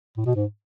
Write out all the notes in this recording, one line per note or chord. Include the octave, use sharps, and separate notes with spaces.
A2
B2
G#2